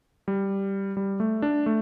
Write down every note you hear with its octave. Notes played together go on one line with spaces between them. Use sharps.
G3
G3
A3
D4
A3